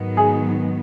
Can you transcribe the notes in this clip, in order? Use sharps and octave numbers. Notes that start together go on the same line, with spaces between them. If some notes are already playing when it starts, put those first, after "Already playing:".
Already playing: G#2 D#3 F#3 B3
G#4